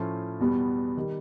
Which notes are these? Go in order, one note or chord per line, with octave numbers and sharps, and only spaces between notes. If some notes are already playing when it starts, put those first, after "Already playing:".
Already playing: A2 F3 A3 C#4 F4
E2 B2 G3 B3
D#3 G3